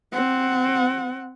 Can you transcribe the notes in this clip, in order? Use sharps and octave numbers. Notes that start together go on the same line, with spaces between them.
C4 F#5